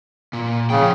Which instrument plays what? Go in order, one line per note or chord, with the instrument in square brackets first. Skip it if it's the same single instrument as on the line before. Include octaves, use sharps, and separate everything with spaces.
[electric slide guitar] A#2
[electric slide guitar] A2 F3 G5 [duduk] C#3